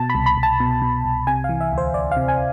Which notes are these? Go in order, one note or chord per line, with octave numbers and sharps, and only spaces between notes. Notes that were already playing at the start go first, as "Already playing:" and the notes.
Already playing: B2 A5
B5
C2
B5
C2
A5
B2
B2
C2
C3 G#5
E3 F5
E5
D2
C5
D2 D5
F5
C3
G#5